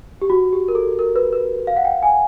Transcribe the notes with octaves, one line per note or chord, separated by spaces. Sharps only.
G4
F#4
G4
A#4
A4
A#4
B4
B4
F5
F#5
G5
G#5